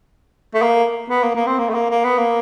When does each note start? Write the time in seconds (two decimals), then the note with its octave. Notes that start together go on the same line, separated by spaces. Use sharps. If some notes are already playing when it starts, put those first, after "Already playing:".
0.54 A3
0.62 A#3
1.10 B3
1.23 A#3
1.35 A#3
1.46 C4
1.59 A#3
1.69 A3
1.75 A#3
1.90 A#3
2.04 B3
2.18 A#3